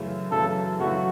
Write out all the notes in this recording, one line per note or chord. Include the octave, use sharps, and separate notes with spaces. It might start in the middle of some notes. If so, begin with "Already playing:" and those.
Already playing: F#2 C#3 E3 A3
F#2 C#3 E3 A3 A4
F#2 C#3 E3 A3 F#4